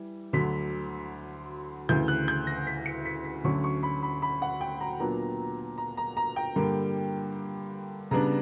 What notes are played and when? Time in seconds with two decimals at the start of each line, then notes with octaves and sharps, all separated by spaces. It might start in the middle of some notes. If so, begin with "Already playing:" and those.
Already playing: E3 G3
0.33 D2 D3 F#3 B6
1.89 D2 C#3 E3 G6
2.08 F#6
2.28 G6
2.47 A#6
2.67 B6
2.86 C#7
3.05 B6
3.25 B6
3.44 D2 D3 F#3 C#4 C#6
3.64 C#6
3.83 B5
4.03 B5
4.22 B5
4.42 F#5
4.61 G5
4.76 B5
4.81 A#5
5.00 A#2 F#3 B3 D4 A#5
5.78 A#5
5.97 A#5
6.17 A#5
6.36 G5
6.56 G2 D3 G3 A#3
8.11 C#3 G3 B3 D4 A#5